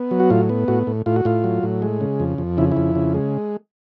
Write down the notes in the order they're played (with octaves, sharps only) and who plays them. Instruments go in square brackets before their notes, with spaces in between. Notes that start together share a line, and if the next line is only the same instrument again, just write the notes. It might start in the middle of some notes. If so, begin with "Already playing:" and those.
Already playing: [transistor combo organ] B3
F#3
F#4
A2 F4
B3
A2 F#4
A2
A2 F4
F#4
A2 F4
F#3
A2
G#3
C#3
F2
F2
C#3 E4
E4
F2
C#3
G#3